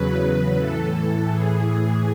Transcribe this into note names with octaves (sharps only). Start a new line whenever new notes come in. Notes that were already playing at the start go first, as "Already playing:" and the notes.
Already playing: E2 C#3 F#3 B4
A2 E3 A4
A2 E3 G#4